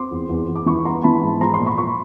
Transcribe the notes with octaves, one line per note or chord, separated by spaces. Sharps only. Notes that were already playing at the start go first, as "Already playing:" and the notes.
Already playing: C4 C6 D6
E2
E2
E2
D6
E3 B5 C#6
B3 A#5 C6
E3 A5 B5
G#2
F3 A#5 C6
A#5 C6
A#2
B5 C#6
F3 B5 C#6